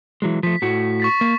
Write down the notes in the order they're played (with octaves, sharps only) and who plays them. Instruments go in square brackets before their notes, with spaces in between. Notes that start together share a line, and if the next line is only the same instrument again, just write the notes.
[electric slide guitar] E3 F#3 G#3
[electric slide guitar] F3 A3 [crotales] B6
[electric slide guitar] A2 A3 F#4
[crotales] C#6 A6 B6
[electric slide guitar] A#3